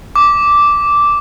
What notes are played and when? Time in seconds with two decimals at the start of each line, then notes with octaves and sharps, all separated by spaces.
0.16 D6